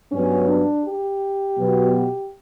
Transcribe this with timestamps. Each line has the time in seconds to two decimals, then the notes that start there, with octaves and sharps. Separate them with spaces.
0.12 G2 F#3 B3 C#4
0.49 D4
0.85 G4
1.56 B2 F#3 B3